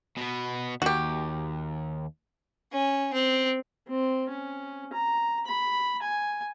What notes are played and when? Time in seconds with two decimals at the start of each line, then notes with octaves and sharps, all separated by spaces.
0.17 B2 B3
0.82 D#2 F#4 G4
2.72 C#4
3.14 C4
3.88 C4
4.29 C#4
4.93 A#5
5.46 B5
6.02 G#5